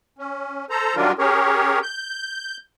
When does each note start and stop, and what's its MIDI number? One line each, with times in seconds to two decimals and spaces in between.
0.19 0.65 61
0.70 0.95 69
0.70 0.95 72
0.70 0.95 82
0.96 1.12 51
0.96 1.12 54
0.96 1.12 55
0.96 1.12 62
0.96 1.12 65
0.96 1.12 70
1.19 1.79 61
1.19 1.79 67
1.19 1.79 68
1.19 1.79 70
1.19 1.79 73
1.83 2.57 91